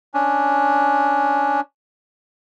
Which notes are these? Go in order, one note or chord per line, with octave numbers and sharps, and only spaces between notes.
C#4 D4